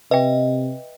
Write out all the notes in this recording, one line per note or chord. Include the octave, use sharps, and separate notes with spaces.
C3 B4 D#5 E5 G5